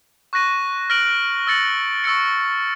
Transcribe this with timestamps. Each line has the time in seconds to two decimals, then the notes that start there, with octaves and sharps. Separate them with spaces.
0.33 C#6 F#6 A#6 D#7
0.90 F6 A#6 D7 F#7
1.47 E6 A6 C#7 F#7
2.04 C#6 E6 A6 C#7